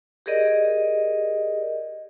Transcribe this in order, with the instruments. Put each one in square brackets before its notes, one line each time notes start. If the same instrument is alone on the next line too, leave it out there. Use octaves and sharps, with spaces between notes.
[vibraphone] G4 G#4 A#4 D5 D#5